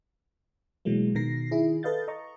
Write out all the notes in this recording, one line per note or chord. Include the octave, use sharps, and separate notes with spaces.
B2 E3 F#3 G#3 A#3
B2 D#3 A#4 A#6 C7
D#3 E4 G#4
A4 B4 D#5 F5 G6 A6
D#5 A#5 C#6